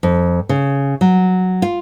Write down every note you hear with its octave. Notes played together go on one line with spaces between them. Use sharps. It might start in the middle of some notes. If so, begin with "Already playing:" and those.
F2
C#3
F#3
F4